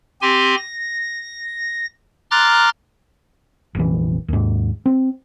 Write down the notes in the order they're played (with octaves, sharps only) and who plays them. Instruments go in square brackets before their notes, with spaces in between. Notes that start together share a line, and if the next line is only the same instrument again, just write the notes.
[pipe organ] C4 G4 G#5 C6
A#6
A#5 C6 D6 F6 F#6 A6
[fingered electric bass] F1 A#1 E3
D#2 G#2
C4